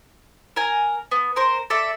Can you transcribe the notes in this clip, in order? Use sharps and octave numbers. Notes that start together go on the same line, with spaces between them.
A#4 G#5
B3
A#4 C5
A4 D5 E5